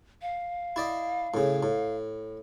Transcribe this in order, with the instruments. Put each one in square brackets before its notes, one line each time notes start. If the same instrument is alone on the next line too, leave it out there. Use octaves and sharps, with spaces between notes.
[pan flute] F5
[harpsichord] E4 D5 D#5
A2 C#3
A2